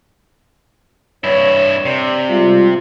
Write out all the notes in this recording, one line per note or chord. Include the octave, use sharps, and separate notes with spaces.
G2 E4 C#5
C3 D5
G3 G#3 F4